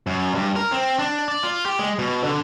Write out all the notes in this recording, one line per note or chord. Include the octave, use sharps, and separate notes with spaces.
F#2
G2
A#4
C4
D4
D5
F4
G4
G#3
B2
D3